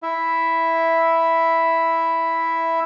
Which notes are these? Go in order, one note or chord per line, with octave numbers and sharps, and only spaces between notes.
E4 E5